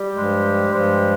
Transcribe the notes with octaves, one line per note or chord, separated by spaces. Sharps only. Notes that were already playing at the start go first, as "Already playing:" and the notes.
Already playing: G3 G4
G2 F3 G#3
G2 F3 G#3